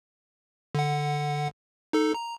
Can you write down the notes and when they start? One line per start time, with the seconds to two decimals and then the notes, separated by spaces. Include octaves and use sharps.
0.75 D3 F#5
1.93 D#4 A4
2.14 A#5